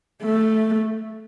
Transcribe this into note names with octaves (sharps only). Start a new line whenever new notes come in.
A3